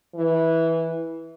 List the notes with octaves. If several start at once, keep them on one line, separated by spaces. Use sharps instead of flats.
E3